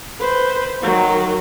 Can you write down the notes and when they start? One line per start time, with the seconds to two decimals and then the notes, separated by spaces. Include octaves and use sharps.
0.20 B4 C5
0.82 D#3 F#3